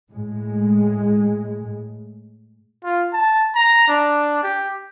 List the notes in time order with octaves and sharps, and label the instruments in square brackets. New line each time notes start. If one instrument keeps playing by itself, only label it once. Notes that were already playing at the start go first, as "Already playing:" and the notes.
[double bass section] A2 G#3
[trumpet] F4
A5
A#5
D4
G4